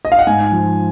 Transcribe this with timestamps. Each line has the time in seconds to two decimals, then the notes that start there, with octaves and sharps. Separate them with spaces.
0.05 D#5
0.12 F5
0.19 F#5
0.27 G#2 G#5
0.52 F3